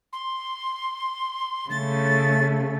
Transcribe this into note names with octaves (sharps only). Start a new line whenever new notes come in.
C6
C#3 A3 A6